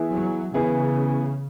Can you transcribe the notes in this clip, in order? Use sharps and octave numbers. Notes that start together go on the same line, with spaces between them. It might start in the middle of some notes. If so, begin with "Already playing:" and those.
Already playing: E3 B3 E4 G#4
F#3
C#3 E3 B3 E4 G#4